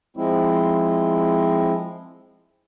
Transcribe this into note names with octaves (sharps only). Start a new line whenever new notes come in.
F3 G#3 C4 E4